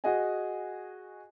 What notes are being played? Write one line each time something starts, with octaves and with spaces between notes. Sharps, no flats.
F#4 G#4 D#5 F#5 G#5